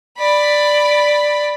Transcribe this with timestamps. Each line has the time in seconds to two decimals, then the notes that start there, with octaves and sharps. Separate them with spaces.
0.18 D5 B5